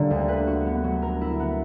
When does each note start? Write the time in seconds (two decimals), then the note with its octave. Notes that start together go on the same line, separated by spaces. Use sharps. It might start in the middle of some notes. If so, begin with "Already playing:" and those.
Already playing: D3 G3 A#3
0.10 D2
0.28 B4
0.47 F#4
0.66 B3
0.84 F#3
1.02 A#4
1.21 E4
1.40 B3